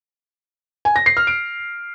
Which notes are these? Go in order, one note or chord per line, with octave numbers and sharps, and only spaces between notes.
G#5
A#6
C7
F6
D7